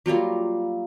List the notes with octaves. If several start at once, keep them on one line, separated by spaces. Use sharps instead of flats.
F#3 G3 A#3 F4